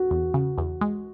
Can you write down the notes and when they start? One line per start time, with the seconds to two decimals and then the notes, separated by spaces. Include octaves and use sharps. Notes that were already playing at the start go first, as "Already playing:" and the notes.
Already playing: F#4
0.11 E2
0.34 C#3
0.58 E2
0.81 G#3